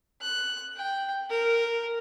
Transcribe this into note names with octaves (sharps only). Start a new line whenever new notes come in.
F#6
G5
A#4